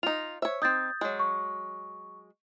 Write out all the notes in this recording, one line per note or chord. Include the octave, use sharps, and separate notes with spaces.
D#4 F4 F7
C5 C#5 E5
C4 D#4 D#6 G6 A6
F#3 G#3
C#6